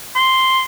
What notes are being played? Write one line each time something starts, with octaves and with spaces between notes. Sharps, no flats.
C6